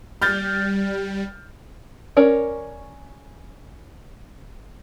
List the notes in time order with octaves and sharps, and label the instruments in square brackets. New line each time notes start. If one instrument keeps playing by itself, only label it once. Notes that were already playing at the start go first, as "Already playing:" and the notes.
[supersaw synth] G3 [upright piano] F6 G6 A6
[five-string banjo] C#4 A#4 C#5 D5